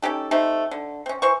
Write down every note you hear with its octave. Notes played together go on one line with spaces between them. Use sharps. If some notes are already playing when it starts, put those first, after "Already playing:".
C#4 D#4 G4 A4
A3 C4 D#4 G4
D3
C4 C#4
E3 C5 C#6